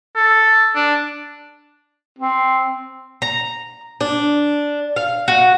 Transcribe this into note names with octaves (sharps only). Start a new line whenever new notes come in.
A4
D4
C4
A#5
D4
F5
F#4